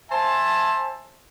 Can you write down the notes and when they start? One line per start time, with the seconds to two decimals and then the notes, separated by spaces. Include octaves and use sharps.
0.12 C5 E5 G#5 A5